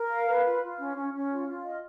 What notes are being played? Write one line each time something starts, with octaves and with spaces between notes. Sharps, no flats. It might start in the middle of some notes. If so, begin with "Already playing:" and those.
Already playing: A#4
F5
B4
F4
F4
C#4
C#4
C#4
F4
F4
D#5